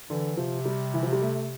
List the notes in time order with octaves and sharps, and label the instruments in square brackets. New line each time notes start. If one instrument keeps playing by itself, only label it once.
[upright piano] D3 [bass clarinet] E3
[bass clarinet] C3 [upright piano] F3
[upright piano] G3
E3
F3
G3
A3